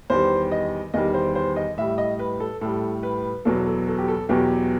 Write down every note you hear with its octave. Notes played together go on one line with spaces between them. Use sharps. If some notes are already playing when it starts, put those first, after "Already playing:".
E2 D#3 G3 C5
D#5
E2 D#3 G3 D#5
C5
C5
D#5
A2 G3 E5
D#5
B4
A4
A2 G3 A4
B4
E2 B2 F#3 A4
A4
A4
G4
A4
E2 B2 F#3 G4